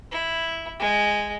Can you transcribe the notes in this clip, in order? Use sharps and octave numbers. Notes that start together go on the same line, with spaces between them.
E4
G#3